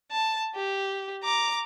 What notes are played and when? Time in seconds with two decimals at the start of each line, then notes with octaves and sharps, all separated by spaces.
0.12 A5
0.56 G4
1.23 A#5 D6